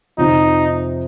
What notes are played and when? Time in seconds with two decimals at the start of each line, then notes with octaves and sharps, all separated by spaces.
0.18 F2 C3 F3 D#4